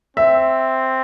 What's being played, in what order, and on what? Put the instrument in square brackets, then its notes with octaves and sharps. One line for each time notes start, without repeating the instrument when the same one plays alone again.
[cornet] C4 [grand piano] E5